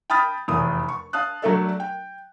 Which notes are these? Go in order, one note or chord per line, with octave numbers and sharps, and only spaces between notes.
G5 A5 B5 D#6 F6 A6
F1 E2 D#6
C#6
F5 A5 D#6 F#6
F#3 A3 D4 A4 D5 E5
G5